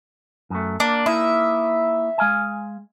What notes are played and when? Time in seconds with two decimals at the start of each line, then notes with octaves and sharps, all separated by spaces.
0.50 F#2 A3
0.80 A#3 D4
1.06 A#3 D#4 E4 E5
2.18 G#3 F5 G#5